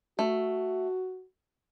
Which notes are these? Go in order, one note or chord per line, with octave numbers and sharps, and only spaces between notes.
A3 F#4